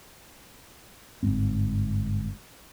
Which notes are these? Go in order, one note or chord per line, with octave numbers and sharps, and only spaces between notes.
G1 G#2 C4